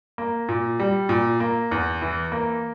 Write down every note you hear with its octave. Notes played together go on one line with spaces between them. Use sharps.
A#3
A#2
G3
A#2
A#3
E2
E3
A#3